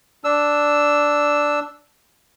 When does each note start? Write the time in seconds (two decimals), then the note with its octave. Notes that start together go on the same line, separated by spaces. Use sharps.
0.24 D4 E6